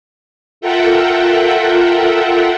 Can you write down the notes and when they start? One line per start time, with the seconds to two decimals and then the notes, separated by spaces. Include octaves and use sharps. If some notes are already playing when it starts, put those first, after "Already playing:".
0.61 F4 A4 A#4 E5 F#5 G5